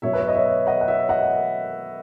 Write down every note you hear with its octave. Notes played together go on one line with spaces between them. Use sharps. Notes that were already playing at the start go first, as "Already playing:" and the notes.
B2 F#3 C#5 E5
B4
C#5
D#5
C#5 E5
D#5 F#5
F#5
C#5 E5
D#5 F#5